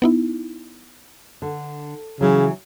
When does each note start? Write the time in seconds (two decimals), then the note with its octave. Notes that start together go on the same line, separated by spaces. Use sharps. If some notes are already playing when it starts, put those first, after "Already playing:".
0.02 B3 D#4 E4
1.42 D3
2.21 C#3 E3 F#3